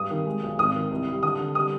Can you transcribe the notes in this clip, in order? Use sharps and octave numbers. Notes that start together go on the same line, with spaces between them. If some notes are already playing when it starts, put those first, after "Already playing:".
Already playing: G2 D#6
D#3
G#3
B1
G#1 D#6
D#3
C2
G3
D3 D#6
D3
G3 D#6